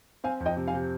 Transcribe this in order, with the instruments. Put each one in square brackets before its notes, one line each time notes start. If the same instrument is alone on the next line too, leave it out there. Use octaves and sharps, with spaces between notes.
[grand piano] C4 [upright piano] F5 G#5
[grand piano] F2
[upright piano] D#5 G5
[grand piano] C3
[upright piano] F5 G#5
[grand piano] C3